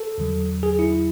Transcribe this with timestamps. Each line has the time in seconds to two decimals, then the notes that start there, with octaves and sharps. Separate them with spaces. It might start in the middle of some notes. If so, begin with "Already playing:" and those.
Already playing: A4
0.18 E2 D3 F#3
0.63 G#4
0.79 E4